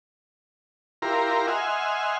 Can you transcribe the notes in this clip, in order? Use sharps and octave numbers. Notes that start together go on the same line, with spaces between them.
E4 F4 G4 A#4 A#5 C6
D#5 E5 F#5 G#5 C6 F6